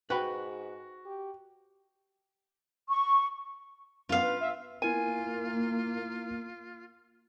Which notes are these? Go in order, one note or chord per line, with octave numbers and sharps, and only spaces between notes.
G#2 F#4 B4 G5 B5
G4
C#6
F#2 B3 F4 F5
B4
E5
A#3 B3 E4 F4 A#4 G#5